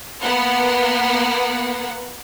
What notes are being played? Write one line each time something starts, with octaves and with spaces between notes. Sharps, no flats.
A#3 B3 F#5